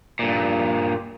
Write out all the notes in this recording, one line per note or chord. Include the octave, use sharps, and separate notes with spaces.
G2 A#2